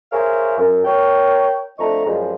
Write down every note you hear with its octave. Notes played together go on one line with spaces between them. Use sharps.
G#4 A#4 C5 C#5 E5 F5
F#2
A#4 C#5 G5
F2 A3 D4 D#5 A#5 C#6
F#2 F3 G3 G#3